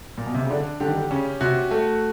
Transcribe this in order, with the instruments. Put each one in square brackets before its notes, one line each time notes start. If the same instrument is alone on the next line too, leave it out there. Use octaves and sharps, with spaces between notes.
[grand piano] A#2
B2
C3
C#3
[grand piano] D3 [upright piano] D4
[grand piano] D3 [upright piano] G4
[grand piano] D#3
D3
[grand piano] C#3 [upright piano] C#4
[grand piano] C3 [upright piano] F#4
[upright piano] A3